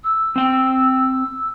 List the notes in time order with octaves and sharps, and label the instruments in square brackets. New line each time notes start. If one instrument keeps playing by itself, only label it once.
[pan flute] E6
[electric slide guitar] C4 G5